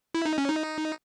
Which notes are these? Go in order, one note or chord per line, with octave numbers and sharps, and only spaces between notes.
E4
D#4
C#4
D#4